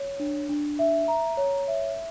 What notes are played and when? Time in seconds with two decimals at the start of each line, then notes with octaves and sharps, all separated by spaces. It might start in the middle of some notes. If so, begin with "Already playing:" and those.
Already playing: C#5
0.20 D4
0.49 D4
0.79 E5
1.08 A#5
1.37 C#5
1.68 E5